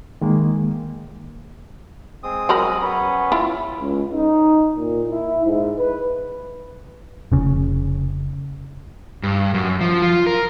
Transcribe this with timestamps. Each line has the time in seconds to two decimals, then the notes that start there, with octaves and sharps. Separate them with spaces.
0.21 D#3 G#3 A#3
2.23 G#3 C4 D#6
2.49 F#3 A#4 B5
2.81 B3 C#4 B4
3.32 E4 F4
3.80 C#2
4.13 D#4
4.76 A#2
5.10 E4
5.45 G#2
5.79 B4
7.32 F1 C#3
9.23 G2
9.54 F#2
9.81 F3
10.02 F4
10.27 A#4